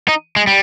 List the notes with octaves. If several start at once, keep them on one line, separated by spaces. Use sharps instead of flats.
D#4
G#3
G3